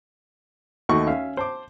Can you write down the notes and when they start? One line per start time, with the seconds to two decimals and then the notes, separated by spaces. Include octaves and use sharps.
0.89 D#2 A3 D#4 F#4 C#6
1.07 C#4 E5 F5
1.37 C5 A5 D6